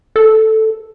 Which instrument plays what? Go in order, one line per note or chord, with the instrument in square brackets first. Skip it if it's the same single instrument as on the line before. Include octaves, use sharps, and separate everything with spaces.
[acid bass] A4